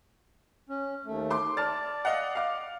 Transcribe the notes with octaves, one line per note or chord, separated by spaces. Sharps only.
C#4
D#2 A3
C6 D6
D5 A5 F6 A6
D#5 F5 F#5
F5 D6